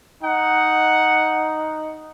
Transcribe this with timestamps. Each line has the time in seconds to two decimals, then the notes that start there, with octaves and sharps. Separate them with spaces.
0.23 D#4 F#5